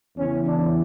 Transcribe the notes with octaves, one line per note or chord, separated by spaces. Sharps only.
E2 C#3 E3 C#4
D4